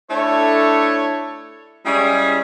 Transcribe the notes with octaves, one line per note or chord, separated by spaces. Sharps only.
A3 D4 E4 A4 C#5
G3 G#3 C#4 E4 G4 G#4